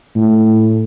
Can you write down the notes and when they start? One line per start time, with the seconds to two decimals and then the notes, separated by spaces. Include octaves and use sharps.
0.15 A2